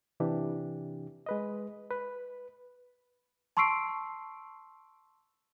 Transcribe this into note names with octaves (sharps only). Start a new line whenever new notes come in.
C3 E3 D4 G4
G#3 B4 D#5
B4
A5 C6 C#6 E6 C7 D7